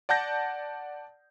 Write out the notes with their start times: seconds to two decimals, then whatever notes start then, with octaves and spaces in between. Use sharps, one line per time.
0.09 D5 F#5 A5 G6 A#6